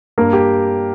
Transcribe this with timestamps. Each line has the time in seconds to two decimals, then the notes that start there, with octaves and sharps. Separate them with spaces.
0.18 G2 A#3 A#4
0.33 G4